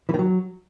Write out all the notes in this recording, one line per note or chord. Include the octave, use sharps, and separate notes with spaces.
E3
D#3
F#3